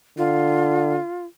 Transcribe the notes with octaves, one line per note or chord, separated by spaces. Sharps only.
D3 F4